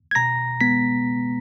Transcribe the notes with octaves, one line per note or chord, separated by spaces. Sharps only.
G#6
B2 A#5 A#6
G#3 B3 B6